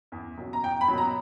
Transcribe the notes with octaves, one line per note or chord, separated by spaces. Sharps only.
E2
B2 F#3
A#5
E2 G5
B5
B2 F#3
A#5